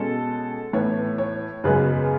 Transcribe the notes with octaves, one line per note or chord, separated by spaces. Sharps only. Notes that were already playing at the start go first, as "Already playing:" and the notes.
Already playing: B2 G#3 C#4 A4
A2 E3 B3 C#5
C#5
F#2 C#3 G#3 B3 B4